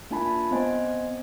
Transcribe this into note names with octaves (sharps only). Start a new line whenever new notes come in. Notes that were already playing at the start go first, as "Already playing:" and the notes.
A#3 D4 F4 G#5 A5 B5
B3 C4 C5 D#5 G#5